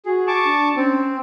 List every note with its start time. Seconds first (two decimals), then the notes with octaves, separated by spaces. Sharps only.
0.05 F#4 G#4
0.27 A5 C#6 D6
0.45 D4
0.76 C4 C#4